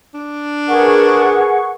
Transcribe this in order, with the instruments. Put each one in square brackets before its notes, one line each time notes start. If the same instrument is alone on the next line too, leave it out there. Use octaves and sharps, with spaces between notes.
[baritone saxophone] D4
[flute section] G#4 F#5 C#6 [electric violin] A#4 B4